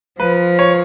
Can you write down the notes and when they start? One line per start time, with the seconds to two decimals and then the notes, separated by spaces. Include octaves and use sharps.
0.19 F3 B4
0.59 C#5